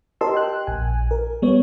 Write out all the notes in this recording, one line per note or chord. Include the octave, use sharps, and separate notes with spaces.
G4 A#4 D#5 A5 C6 E6
G5 F#6
A#1 G#5
A#4
G3 B3 C#5